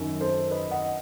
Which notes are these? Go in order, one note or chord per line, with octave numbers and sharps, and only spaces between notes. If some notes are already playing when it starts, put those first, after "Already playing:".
Already playing: F#2 D#3
A4 C5
B4 D#5
D#5 F#5